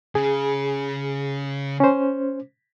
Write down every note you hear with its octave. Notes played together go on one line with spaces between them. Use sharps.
C#3 G#4
C#4 C5